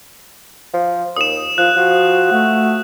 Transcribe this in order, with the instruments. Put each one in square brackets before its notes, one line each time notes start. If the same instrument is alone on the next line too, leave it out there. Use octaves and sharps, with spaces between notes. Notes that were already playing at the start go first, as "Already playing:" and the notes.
[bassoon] F3
[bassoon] D#2 [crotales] D#6 E7
[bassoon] F3 [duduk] F4 [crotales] F#6
[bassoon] F3 [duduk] F#4
[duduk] A3 [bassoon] F#4